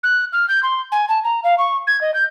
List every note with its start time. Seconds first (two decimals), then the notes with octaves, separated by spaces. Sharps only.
0.03 F#6
0.33 F6
0.48 G6
0.63 C6
0.92 G#5
1.09 A5
1.24 A#5
1.44 F5
1.58 C#6
1.87 G#6
2.01 D#5
2.14 G6